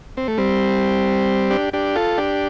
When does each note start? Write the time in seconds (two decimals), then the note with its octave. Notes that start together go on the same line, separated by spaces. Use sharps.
0.17 C4
0.28 A3
0.38 G3 C4
1.51 D4 G4
1.73 D4 G4
1.96 F4 A4
2.18 D4 G4